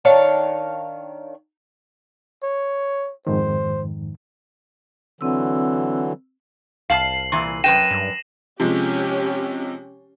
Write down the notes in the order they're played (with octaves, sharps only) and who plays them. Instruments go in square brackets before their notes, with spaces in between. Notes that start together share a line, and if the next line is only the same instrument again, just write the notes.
[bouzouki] D#3 D4 C#5 F5
[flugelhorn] C#5
[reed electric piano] F2 G#2 D#3 [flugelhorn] C5
[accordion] D3 E3 F#3 [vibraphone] C4 E6
[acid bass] C2 [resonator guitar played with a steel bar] F5 A5 [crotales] C7 F#7
[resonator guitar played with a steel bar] A#2 E3
[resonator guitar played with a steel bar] F#2 B4 G5 [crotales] A#6 D#7 E7
[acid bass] G2
[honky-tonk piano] C3 F3 G#3 [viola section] C#4 G4